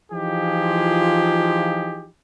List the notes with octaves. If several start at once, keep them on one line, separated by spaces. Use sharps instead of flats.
E3 F3 D#4 F4 G4 G#4